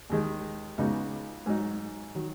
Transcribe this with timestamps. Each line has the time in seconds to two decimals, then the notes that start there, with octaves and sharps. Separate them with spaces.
0.10 D#2 D#3 G#3 D#4 G#4
0.78 C#2 C#3 B3 D#4 F#4
1.46 G#2 F#3 D#4
2.15 D#3 F#3